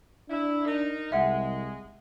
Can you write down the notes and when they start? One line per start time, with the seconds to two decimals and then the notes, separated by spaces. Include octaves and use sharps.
0.30 D4 E4
0.65 D#4 A#4
1.12 C2 G#3 E5 F#5